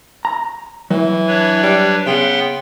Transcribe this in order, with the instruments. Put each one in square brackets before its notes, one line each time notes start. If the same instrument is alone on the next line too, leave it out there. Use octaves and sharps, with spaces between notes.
[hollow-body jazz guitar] A#5
[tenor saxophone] E3 [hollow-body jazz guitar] F#3
[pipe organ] D4 B4 C#5
[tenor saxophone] G3
[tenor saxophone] C#3 [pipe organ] B3 G5 C6